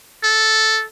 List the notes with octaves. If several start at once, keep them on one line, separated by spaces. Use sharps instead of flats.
A4